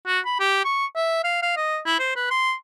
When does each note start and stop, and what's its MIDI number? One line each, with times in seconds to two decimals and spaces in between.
0.07 0.20 66
0.26 0.37 83
0.40 0.60 67
0.65 0.86 85
0.96 1.23 76
1.24 1.38 77
1.42 1.52 77
1.57 1.79 75
1.86 1.97 64
1.99 2.13 72
2.16 2.30 71
2.31 2.53 84